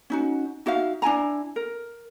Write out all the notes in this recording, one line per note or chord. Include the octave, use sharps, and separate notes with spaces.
C#4 D#4 F#4
D#4 F#4 E5 F5
D4 E4 G#5 A#5
A#4